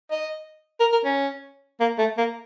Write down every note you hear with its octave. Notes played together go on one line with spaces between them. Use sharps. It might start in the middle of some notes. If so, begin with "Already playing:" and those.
D#5
A#4
A#4
C#4
A#3
A3
A#3